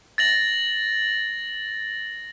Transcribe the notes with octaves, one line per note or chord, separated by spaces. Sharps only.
A6 A#6 F#7